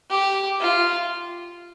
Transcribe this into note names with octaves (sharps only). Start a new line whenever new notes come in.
G4
F4